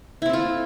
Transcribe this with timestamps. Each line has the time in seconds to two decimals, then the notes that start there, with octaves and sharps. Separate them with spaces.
0.22 E4
0.26 C4
0.30 A4
0.33 F4